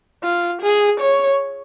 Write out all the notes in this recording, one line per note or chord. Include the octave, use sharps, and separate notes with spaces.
F4
G#4
C#5